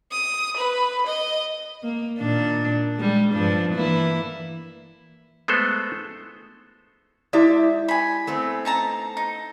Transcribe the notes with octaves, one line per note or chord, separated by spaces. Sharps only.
D#6
B4
D#5
A#3
A#2 D#3 D4
G3 G#3
G2 F3 D4
E3 A#3 E4
G#3 A3 B3 A4 C5
G#3 E4 G4 D5 E5
G#5 B5
A3 B3 C4
D#4 A5 A#5
D#4